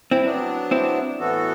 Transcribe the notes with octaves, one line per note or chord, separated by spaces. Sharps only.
C4 E4
F#3 B3 D4
C4 E4
A2 E3 B3 F#4 A4